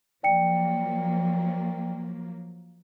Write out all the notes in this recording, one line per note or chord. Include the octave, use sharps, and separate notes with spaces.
F3 F#3 A#3 D5 G5 C#7